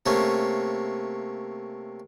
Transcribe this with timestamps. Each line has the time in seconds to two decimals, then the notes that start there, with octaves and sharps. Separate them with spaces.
0.06 C3 A3 A#3 C#4